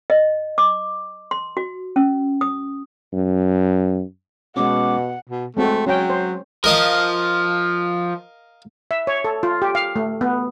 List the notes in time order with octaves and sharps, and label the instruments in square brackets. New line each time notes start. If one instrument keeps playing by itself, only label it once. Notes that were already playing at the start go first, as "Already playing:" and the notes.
[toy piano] D#5
D6
C6
F#4
C#4
D#6
[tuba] F#2
[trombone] B2 [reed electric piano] G#3 B3 C#4 [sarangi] F#5 [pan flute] D6
[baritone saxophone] B2
[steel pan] G#3 C4 F#4 [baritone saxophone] A3
[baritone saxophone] F#3 [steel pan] C#4 G5
[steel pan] C5
[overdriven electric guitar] F3 [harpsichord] A#4 D#5 F5
[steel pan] E5
C#5
A4
F4
G4
F5
A3
B3